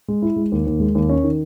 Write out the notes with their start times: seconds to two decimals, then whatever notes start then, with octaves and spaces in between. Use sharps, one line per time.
0.08 G#3
0.22 E4
0.36 G#3
0.52 D#2
0.67 D#2
0.80 G#3
0.95 D#2
1.09 C#4
1.24 D#3